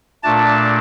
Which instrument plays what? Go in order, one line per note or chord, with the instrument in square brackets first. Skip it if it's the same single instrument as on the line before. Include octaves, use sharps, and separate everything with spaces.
[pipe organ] A#2 A3 D4 A5